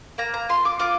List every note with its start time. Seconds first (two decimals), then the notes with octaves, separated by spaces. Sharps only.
0.18 A#3 A#5
0.34 A#5
0.49 F4 C6
0.65 D6
0.79 F4 D6